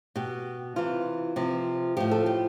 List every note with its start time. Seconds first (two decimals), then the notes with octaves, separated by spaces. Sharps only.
0.16 B2 G4
0.76 C3 E3 F4
1.36 C3 F3
1.97 A2 F3 G4
2.11 A4
2.26 G4